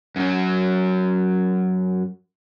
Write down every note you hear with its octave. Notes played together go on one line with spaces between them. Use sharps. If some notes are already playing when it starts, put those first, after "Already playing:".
F#2 F#3